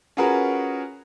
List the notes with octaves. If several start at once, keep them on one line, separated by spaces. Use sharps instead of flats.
C#4 F4 F#4 G#4 A#4 B4